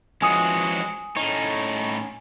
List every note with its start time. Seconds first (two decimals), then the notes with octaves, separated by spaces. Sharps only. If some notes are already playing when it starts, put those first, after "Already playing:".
0.22 E3 F3 G#3 C#4 F#4 G#5 D#6
1.17 A2 C#4 D#4 C#5